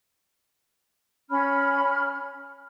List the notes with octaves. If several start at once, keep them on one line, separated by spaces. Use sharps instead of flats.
C#4 B5 F6